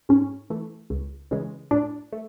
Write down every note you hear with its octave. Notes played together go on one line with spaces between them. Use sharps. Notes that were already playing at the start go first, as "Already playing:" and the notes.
G#2 C#4
E3 A3
C#2
C#3 E3 G#3
A2 D4
A3